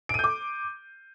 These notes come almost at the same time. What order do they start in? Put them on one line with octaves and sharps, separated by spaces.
D7 D#7 G6 D6